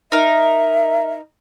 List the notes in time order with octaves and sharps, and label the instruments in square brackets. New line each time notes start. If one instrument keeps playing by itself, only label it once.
[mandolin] D#4 A#4 [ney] E5